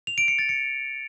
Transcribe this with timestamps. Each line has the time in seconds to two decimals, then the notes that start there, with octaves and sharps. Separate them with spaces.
0.07 F7
0.18 D7
0.28 C#7
0.39 A6
0.49 C#7